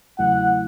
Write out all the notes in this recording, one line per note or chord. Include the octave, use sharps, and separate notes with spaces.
E2 C#3 F#3 A3 E4 F#5